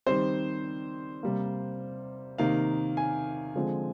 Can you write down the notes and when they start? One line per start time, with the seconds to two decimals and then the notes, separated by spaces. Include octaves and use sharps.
0.07 D#3 G3 C4 C5
1.23 C3 G3 A#3
2.38 C3 D#3 A#3 F5
2.97 G#5
3.55 D3 F3 G#3 C4